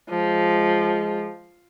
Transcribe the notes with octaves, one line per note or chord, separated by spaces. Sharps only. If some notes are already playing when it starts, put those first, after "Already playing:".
F3 G#3